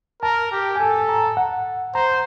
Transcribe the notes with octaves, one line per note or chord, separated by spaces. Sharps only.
A#4 A5
G4
G#5
A4 A5
A#5
F#5
C5 A#5